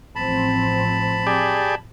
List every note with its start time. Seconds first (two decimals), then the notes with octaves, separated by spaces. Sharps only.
0.15 A1 F3 C4 A5 B5
1.27 G4 G#4 D5